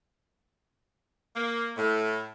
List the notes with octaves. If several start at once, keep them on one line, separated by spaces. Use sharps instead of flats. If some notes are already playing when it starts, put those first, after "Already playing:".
A#3
A2